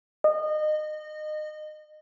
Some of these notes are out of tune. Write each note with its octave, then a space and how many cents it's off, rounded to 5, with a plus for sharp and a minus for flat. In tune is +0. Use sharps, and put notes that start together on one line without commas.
D#5 -25